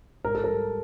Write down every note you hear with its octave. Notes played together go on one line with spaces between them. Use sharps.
G#2 A#4
A4
G3 A#4